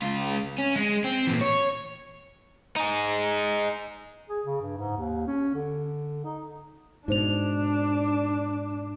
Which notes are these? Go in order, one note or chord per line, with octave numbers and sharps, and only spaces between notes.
C#2 F4
C#4
G#3
C4
A#2 E3
C#5
D#4 G#4
G#4
C#3
G2
G#2
D#2
C#4
D3
D#4
G#2 B2 D4 D#4 C5 F7